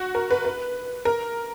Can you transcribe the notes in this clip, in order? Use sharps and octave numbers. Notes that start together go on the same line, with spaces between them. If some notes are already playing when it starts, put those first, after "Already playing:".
Already playing: F#4
A#4
B4
B4
A#4